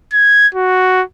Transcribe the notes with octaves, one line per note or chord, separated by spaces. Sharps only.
G#6
F#4